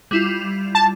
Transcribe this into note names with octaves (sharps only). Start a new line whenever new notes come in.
G3 E4 F4
A5